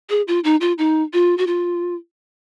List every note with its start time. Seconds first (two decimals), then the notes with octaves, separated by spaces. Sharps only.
0.10 G#4
0.28 F4
0.44 D#4
0.61 F4
0.78 D#4
1.13 F4
1.38 F#4
1.47 F4